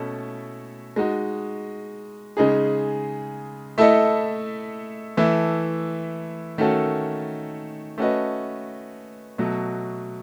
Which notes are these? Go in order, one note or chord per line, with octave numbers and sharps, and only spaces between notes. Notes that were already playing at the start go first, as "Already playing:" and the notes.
Already playing: B2 A3 C#4 E4 A4
G#3 D#4 F#4
C#3 G#3 D#4 G#4
A3 E4 A4 D#5
E3 A3 E4
D#3 A3 C#4 F#4 A4
A3 C#4 F#4 B4 D#5
B2 F#3 A3